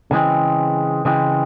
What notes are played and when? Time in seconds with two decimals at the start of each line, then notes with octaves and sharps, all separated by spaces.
0.11 C#3 E3 G#3 C4
1.05 C#3 E3 G#3 C4